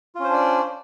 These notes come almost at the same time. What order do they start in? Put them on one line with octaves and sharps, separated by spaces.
F4 C#4 C5 D4 D5